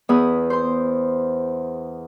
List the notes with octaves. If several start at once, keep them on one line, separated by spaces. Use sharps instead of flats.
E2 B3 G#4 B4 D#6
C5 C6